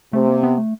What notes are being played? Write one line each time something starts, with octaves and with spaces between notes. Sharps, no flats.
C3 A3
A#3
B3
A3